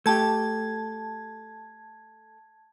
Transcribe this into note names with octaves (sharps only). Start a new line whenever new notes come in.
A3 G4 A5 G#6